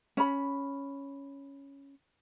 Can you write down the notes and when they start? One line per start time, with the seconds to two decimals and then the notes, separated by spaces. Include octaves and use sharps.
0.17 C#4 B5